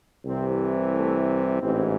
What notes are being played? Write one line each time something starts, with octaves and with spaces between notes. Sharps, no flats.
C2 C3 E3 C4
A3
A1 G#2 E3 C4